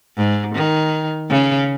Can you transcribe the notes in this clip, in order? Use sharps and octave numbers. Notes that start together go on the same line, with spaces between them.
G#2
D#3
C#3